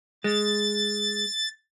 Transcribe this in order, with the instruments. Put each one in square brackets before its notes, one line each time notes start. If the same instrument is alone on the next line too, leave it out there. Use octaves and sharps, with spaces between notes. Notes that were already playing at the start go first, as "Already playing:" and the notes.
[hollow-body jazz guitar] G#3 [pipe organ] A6